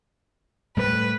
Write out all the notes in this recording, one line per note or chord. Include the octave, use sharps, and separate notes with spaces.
A2 G3 A3 B4